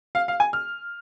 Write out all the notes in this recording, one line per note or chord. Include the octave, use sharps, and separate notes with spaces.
F5
F5
G#5
F6